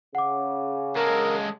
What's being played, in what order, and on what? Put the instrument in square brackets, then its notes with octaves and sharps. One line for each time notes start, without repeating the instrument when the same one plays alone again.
[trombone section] C#3 [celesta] F#5 D6
[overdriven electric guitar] G#3 A4 [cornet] A#4